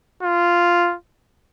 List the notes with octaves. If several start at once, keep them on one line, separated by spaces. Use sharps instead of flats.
F4